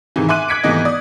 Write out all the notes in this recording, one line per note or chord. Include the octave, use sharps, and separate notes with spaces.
G#2 C3 D#3 E3
E5 G#5 C6 D6 F#6 D#7
D6 F#6 G#6 B6 C#7 D7
G#1 C3 E3 A3 B3 D#5
D5 D#6